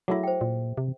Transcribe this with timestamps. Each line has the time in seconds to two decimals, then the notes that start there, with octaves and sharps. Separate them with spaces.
0.08 F#3 A3 E4 G#4 E5
0.23 C5 G5
0.41 A#2
0.77 C3